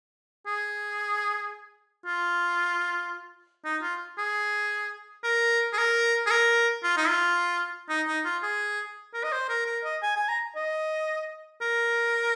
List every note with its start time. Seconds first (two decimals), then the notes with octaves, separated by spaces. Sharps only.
0.47 G#4
2.06 F4
3.65 D#4
3.82 F4
4.18 G#4
5.24 A#4
5.73 G#4
5.78 A#4
6.26 G#4
6.31 A#4
6.83 F4
6.97 D#4
7.09 F4
7.89 D#4
8.07 D#4
8.25 F4
8.43 G#4
9.14 A#4
9.24 D#5
9.32 C5
9.49 A#4
9.66 A#4
9.84 D#5
10.02 G#5
10.16 G#5
10.29 A#5
10.56 D#5
11.61 A#4